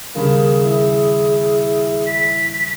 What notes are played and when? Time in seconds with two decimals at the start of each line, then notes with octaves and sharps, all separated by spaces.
0.15 D#1 C#3 A#3 G#4 B5
0.64 E4
2.07 B6